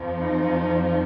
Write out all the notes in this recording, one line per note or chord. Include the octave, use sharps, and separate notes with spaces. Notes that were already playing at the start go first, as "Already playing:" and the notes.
Already playing: F2 F3
D#4